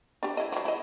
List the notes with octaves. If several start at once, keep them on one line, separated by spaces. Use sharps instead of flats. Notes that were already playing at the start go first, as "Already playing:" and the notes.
D4 G4
E4 D#5
F3 F#3
E4 D#5